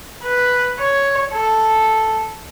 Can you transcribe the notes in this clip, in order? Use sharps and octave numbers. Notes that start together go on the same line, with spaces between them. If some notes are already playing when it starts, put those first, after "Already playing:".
B4
C#5
A4